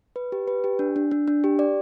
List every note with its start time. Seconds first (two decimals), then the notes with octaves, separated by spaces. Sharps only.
0.16 B4
0.32 G4
0.48 B4
0.64 G4
0.79 D4
0.96 D4
1.11 D4
1.28 D4
1.44 G4
1.59 D5